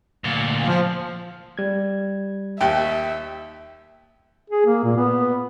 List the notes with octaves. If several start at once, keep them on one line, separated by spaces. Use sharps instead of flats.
D2 A#2
F3
G3 G#6
D#2 G4 E5 G5
G#4
A#3
A#2
B3